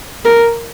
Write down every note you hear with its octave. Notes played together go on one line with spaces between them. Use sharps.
A#4